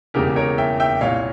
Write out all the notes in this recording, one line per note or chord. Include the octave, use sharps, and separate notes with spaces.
E1 E2 C#3 G4 A#4
A#4 C#5
E5 G5
E5 G5
C2 A#2 C#5 F5